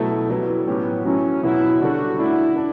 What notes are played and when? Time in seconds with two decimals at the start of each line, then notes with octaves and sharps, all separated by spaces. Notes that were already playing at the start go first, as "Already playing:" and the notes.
Already playing: B2 F#3 A3 E4 A4
0.29 F#3 G3 B3 E4 A4
0.67 A2 F#3 B3 C#4 G4
1.05 F#3 A3 C#4 E4
1.43 B2 F#3 C#4 E4 F#4
1.81 D3 G3 D4 F#4 A4
2.18 A3 D4 E4 F#4
2.56 D4 A4